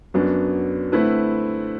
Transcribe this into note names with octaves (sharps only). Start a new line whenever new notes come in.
F#2 F#3 B3 D4
D3 A3 C4 E4 B4